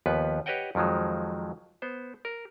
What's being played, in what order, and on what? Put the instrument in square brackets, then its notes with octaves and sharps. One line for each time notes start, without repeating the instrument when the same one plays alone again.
[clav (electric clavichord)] D#2 F3 B3 B4
G4 B4 C#5 D#5 F#5 G5
F2 D#3 F3 F#3 G#3
B3 C5
A#4